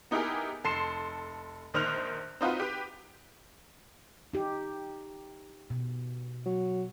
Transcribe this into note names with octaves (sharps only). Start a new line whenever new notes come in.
B3 D#4 E4 G4 G#4 A#4
F1 A4 C6 C7 E7
A#1 D#3 C5 F6 F#6 F7
C4 D#4 F4 F#4 B4
G4 B4
D#4 G4
B2
F#3